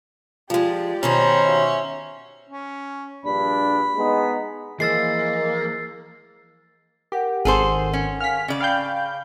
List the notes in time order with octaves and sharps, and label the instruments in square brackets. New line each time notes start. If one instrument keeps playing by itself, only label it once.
[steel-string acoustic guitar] F3 G#3 [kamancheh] G4 D5
[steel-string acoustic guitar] B2 D#3 C#5 [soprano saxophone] C#4 [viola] C5 A#5
[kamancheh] F#4 E5
[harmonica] C#4
[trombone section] A#1 G2 D4 [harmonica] B5
[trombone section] G#3 B3 D#4
[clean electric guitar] E3 F3 [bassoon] G#3 [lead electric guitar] A#3 [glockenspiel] E6 A6 C7
[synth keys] G4 [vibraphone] A#4 F#5
[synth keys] G#1 [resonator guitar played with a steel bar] G#4 A4 C5
[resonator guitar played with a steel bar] C#4
[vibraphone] F5 G#5 [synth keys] F6 B6
[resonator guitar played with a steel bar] C#3 D5 [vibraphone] C#4
[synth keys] F5 G5 G6 [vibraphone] B5